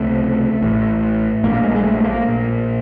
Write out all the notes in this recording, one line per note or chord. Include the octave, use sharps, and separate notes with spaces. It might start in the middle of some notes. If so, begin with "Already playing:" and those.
Already playing: C#2 C3 A3
A1 A2
A#1 A#2 A#3
G#3
G#3
A3
A3
A#3
A#1 A#2